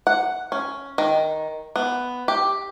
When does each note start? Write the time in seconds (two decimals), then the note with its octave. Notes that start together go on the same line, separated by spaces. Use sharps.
0.07 F#5
0.52 C#4
0.98 D#3
1.76 B3
2.28 G4